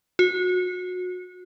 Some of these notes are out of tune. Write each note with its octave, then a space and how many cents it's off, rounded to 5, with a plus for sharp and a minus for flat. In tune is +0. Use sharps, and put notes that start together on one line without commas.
F#4 -30